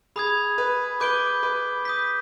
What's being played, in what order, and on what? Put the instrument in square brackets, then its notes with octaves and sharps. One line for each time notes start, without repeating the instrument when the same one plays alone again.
[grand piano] G#4 [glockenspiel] B5 D#6 G#6
[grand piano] B4
[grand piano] B4 [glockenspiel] D6 G6 D7 G7
[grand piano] B4
[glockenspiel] D#6 G6 B6